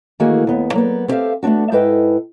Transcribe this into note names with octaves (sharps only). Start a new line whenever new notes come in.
D#3 E3 A3 A#3 F#4 G#4
D#2 B3
F#3 A#3 B3
B3 C4 G4 A4 E5 F5
A3 B3 C4 D4 F#4
G#2 E4 A4 B4 D#5 G5